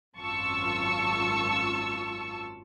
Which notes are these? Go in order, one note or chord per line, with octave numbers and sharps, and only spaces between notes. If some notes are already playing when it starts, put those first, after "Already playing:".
G#1 F#2 F4 A5 C#6 E6